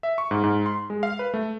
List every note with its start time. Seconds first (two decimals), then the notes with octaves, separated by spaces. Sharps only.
0.03 E5
0.18 C#6
0.31 G#2
0.44 G#2
0.66 C6
0.90 G#3
1.03 F5
1.19 B4
1.34 A3